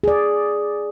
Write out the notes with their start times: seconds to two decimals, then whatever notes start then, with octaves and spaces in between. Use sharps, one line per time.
0.04 G#4 D5